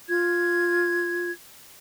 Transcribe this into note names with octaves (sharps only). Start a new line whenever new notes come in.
F4 G#6